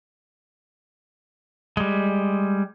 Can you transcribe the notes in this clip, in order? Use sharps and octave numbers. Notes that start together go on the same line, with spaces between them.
G3 G#3